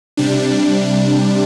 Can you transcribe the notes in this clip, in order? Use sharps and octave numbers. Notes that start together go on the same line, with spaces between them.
C3 G3 D4